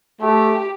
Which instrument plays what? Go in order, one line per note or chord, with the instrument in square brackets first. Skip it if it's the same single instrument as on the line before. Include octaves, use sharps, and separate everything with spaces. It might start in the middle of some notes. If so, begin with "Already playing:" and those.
[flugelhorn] A3 [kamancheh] G4